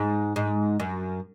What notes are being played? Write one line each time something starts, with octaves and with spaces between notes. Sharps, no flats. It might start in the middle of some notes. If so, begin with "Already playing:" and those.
Already playing: G#2
G#2
F#2